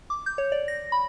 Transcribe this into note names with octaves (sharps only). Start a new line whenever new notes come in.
D6
G6
C#5
D5
A#6
B5